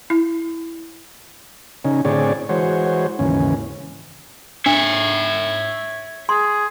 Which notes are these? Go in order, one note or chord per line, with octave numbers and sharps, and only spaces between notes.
E4
C#3 C#4 D#4
A2 D3 C4 G#4 C#5 D5
E3 G#3 F#4 C5 C#5
D#2 G#2 C#3 E3 C#4
D4 C#5 E5
G#4 C6